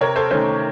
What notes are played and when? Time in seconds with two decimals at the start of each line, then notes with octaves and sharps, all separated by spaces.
0.01 C3 A#4 C#5
0.16 A4 C5
0.31 D#3 A3 C#4 A4 C5